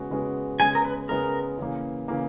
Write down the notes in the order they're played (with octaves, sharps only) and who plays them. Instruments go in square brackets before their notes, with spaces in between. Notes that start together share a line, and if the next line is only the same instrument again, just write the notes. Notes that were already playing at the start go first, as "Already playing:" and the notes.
Already playing: [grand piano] C#3 G#3 B3 F#4
C#3 G#3 B3 F#4
[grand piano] C#3 G#3 B3 [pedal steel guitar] G#5
[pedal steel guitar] A#4
B4
[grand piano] C#3 G#3 B3 [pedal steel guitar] A#4
[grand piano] C#3 E3 A#3
C#3 E3 A#3